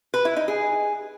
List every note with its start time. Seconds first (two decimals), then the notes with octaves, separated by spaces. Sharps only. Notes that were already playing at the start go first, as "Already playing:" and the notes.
0.14 B4
0.25 E4
0.36 D#4
0.48 G#4